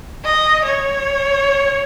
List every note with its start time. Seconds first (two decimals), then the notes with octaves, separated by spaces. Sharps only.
0.24 D#5
0.65 C#5